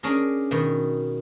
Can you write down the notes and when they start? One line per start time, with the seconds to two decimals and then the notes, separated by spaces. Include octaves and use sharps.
0.03 C#4 D4 G#4 A#4
0.51 B2 D#3